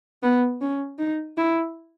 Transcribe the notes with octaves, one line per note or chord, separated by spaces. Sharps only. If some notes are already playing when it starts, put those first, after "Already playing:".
B3
C#4
D#4
E4